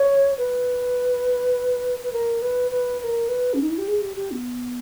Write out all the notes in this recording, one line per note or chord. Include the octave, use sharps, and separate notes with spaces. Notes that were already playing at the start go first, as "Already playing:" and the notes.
Already playing: C#5
B4
B4
A#4
B4
B4
B4
A#4
B4
C#4
D#4
E4
G4
G#4
G4
G4
B3